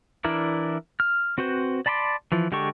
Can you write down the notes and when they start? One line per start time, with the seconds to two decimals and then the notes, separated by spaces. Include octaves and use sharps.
0.24 E3 D4 E4 A#4 D5
1.00 F6
1.38 C4 F#4 B4 C5
1.86 D5 A5 B5 C6 D6
2.32 E3 F3
2.52 D3 G#3 G4 A4 C#6